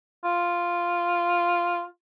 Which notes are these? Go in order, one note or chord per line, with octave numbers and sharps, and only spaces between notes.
F4